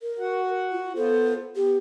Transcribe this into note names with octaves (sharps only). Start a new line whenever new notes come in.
A#4
F#4 F#5
F4
B3 F4 A4 C5
B3 G4